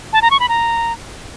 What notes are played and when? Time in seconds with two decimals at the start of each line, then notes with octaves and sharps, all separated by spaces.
0.13 A5
0.22 A#5
0.31 C#6
0.40 B5
0.49 A#5